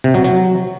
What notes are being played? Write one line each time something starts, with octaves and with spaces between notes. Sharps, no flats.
C3
F#3
F#3